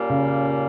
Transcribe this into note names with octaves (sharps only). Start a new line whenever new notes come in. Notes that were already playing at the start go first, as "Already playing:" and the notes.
Already playing: A#2 G3 A#3 C#4
C#3